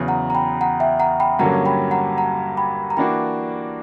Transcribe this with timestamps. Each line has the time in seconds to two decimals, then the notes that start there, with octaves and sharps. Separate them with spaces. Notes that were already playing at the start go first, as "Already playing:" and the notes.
Already playing: E2 C#3 F#3
0.08 F#5 A#5
0.30 A#5
0.35 G5 B5
0.61 F#5 A#5
0.80 E5 G5
1.00 F#5 A#5
1.20 G5 B5
1.39 G2 D3 F#3 A#3 C#4 F#5 A#5
1.66 G5 B5
1.91 F#5 A#5
2.18 F#5 A#5
2.57 G5 B5
2.90 A#5
2.97 E3 A#3 D4 F#4 G5 B5